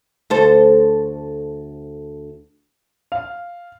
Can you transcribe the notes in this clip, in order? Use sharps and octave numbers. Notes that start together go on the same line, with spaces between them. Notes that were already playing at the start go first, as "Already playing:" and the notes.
D2 A4 C5
F5